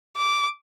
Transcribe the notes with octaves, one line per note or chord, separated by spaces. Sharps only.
D6